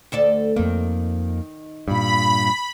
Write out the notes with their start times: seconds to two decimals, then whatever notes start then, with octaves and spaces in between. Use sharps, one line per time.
0.12 D2 A4 D5
0.56 F2 D#3 A#3
1.88 G2 A#2 B5